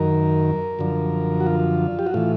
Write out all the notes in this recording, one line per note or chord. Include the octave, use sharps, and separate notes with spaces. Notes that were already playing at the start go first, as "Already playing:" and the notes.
Already playing: F#2 D#3 A#4
F#2 D3 F3
F#4
F4
G4
F#4
A2 E3 F4